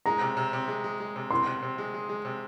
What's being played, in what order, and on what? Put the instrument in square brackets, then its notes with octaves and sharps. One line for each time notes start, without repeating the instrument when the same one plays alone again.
[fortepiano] G#3 [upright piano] A#5
[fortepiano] C3
C3
C3
G#3
G#3
G#3
C3
[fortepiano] C3 [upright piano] C6
[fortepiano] C3
C3
G#3
G#3
G#3
C3